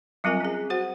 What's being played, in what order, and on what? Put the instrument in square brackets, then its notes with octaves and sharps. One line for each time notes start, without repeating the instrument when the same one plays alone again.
[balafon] F#3 G3 C4 F4 A#4 G#5
C#4 G#4
F#4 C5 F#5